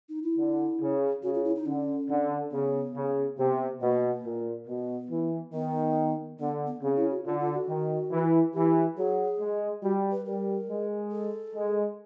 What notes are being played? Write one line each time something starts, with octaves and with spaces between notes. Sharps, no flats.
D#4
E4
D3
C#3
C#3 F#4
F4
E4
D#4
D3 C#4
D3
C#3 B3
C#3
C3 B3
B2 A#3
A#2
B2 B3
E3
D#3 B3
D3 B3
B3
C#3 C4
E4
F#4
D3 F4
F4
F#4
D#3
E3
E3 G4
F#3 G#4
G#3
G3 F#4
B4
G3 A#4
G#3
A4
G#3